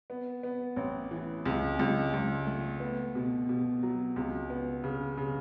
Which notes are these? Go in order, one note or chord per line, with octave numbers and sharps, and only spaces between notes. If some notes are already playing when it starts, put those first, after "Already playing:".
B3
B3
A1
E3
C#2
C#2
C#2
A3
B3
B2
B2
F#3
C#2
B3
C#3
C#3